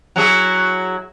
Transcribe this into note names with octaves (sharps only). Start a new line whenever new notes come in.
F#3 E4 G#4